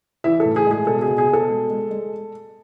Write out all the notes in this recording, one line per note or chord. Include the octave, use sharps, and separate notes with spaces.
E3 E4 E5
A4
A2
G#4
G#3 G#4
B2 A4
G#4
B2
G#4
B2 A4
G#3
G#3
G#3